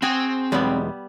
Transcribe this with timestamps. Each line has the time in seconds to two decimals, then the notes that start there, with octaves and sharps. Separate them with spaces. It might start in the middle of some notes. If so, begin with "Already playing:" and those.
0.02 C4 F#4 G#4 G5 G#5
0.52 B1 E2 G3 G#3 B3